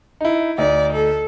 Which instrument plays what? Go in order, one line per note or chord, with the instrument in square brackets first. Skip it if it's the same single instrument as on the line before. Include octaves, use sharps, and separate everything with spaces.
[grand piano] D#4 E4
[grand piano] D2 D#4 [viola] D5
[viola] A4